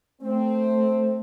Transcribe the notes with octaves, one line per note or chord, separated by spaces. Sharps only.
A3 C4